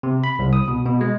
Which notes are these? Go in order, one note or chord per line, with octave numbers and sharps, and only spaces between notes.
C3
B5
C2
D#6
B2
B2
G#3